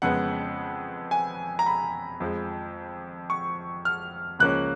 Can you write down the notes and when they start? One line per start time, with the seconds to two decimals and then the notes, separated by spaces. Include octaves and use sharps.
0.02 F2 C#3 G#3 B3 F#5
1.11 G#5
1.59 A#5
1.66 B5
2.20 F2 F3 G#3
3.30 C#6
3.85 F6
4.39 C#2 C#3 F3 A#3 C#4 F#6